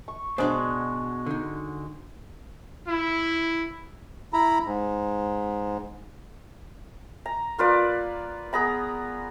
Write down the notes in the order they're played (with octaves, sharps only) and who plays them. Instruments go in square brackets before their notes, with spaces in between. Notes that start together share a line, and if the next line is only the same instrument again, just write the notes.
[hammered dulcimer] C#6
[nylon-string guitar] B2 D4 [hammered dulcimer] G#3 F#4 [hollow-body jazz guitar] C5 D5 B5
[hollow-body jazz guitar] D3 D#4
[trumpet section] E4
[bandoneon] E4 A#5 B5
G#2
[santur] A#5
A#3 F4 B4 D5
B3 G#4 A#5 B5